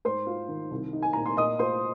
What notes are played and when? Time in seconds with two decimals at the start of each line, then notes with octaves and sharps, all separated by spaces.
0.05 G#2 C5 C6
0.27 F4
0.48 D#3
0.71 C2
0.93 D#4
1.02 G#5
1.13 A#2 A#5
1.26 C6
1.37 A#2 D#5 D#6
1.59 F4 C5 C6